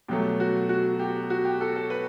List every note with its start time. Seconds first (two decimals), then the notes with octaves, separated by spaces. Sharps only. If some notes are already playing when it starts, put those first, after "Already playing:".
0.08 B2 F#3 A3 G4
0.40 F#4
0.69 F#4
0.99 G4
1.30 F#4
1.45 G4
1.61 A4
1.76 A4
1.90 B4